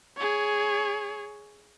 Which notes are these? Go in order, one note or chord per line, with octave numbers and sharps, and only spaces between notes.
G#4 C#5